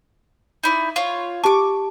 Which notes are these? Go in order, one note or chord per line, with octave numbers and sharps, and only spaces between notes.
D#4 E4 D5
F4 C#5
G4 A5 C#6 D6